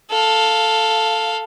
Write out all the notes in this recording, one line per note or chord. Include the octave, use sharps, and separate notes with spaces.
A4 F5